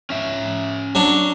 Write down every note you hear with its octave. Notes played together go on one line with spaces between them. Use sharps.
C#4 E5
F#3 D4